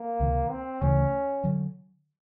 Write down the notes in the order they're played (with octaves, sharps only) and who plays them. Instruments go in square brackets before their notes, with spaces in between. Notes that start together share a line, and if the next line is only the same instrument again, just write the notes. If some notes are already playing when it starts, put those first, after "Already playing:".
Already playing: [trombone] A#3
[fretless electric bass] C#2 C3 D#3
[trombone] C4
[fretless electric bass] D2 C#3 E3 A3 [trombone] C#4
[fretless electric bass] D3 F#3